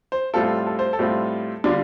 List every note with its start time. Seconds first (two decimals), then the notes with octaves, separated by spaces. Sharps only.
0.12 C5
0.34 A2 G3 C4 F4 A4
0.67 A4
0.79 C5
0.93 A4
0.99 A2 G3 C4 F4
1.64 D3 G3 D4 F4